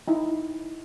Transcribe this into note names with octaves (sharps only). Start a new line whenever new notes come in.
D#4 E4